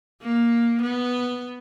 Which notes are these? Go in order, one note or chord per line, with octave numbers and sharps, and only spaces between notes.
A#3
B3